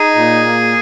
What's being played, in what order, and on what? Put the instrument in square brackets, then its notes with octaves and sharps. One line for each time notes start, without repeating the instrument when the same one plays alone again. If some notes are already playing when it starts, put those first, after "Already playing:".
Already playing: [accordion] D#4 [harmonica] G#4
[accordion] A#2
A#3